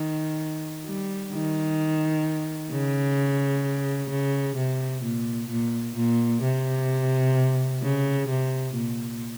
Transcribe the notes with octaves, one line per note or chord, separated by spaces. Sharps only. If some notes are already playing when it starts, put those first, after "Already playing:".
Already playing: D#3
G3
D#3
C#3
C#3
C3
A#2
A#2
A#2
C3
C#3
C3
A#2